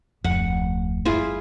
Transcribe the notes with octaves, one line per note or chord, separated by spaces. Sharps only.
D1 F2 A3 F#5
G1 E4 F4 G#4